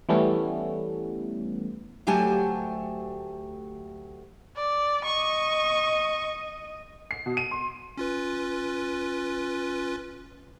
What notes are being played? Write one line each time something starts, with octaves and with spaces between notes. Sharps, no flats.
E3 G3 A3 B3 C#4
D2 F#3 A3 G4 G#5 A5
D5
D#5 C#6
C7
B2
D#7
C6
C#4 F4 B4